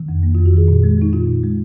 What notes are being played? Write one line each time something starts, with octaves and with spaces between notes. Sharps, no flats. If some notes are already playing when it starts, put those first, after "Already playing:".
Already playing: D#3
F2
A#3
F4
F2
F#4
D#3 G#4
A#2
G#3
G#3 D#4
A#2 F4
A#2
G#3